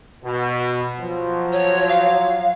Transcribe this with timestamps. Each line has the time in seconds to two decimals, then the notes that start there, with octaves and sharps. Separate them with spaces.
0.24 B2
0.98 F3 F#3
1.52 C#5
1.88 F5